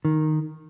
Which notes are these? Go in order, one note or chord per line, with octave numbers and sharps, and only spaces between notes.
D#3